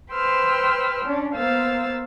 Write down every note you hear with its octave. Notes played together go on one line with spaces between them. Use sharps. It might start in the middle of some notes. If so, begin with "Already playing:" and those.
B4 C5 G5 C6 E6 F6
C#4 D4
A#3 B3 C5 F5 E6 A6